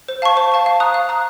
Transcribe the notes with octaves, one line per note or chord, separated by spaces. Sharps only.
C5
F5 A5 C#6
C5
F5 A5 C#6
F5
A#5 D#6 F#6
F5
A#5 D#6 F#6